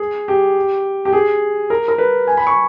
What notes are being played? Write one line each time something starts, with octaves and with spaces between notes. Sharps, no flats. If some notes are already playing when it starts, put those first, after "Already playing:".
Already playing: G#4
G4
G4
G#4
A#4
A#4
B4
G#5
B5
C#6